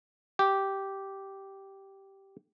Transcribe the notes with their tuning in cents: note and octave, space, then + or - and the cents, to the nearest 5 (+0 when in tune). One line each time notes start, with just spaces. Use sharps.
G4 -10